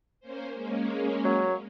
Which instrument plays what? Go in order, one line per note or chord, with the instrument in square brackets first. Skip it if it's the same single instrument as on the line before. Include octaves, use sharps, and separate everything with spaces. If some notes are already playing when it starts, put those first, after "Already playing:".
[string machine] A#3 C#4 C5
G#3 A#3 C#4
[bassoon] F#3